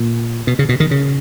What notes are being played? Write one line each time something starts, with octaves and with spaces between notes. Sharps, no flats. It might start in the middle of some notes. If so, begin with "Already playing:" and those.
Already playing: A#2
B2
C#3
B2
D#3
C#3